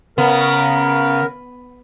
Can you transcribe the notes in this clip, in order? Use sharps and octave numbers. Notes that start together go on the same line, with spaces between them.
C#3 B3 A#4